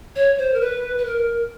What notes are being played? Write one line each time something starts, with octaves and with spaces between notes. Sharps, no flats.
C#5
C5
A#4
B4
B4
A#4